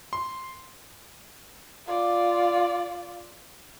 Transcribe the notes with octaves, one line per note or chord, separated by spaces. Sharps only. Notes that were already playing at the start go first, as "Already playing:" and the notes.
C6
F4 D5